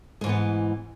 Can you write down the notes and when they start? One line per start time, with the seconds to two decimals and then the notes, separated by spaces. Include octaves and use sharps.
0.21 G#3
0.24 G#2
0.26 E3
0.29 B3